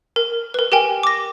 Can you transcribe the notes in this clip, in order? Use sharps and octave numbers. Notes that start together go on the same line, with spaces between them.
A#4
A#4 B4
G4 A#4 G5 G#5
D6 A#6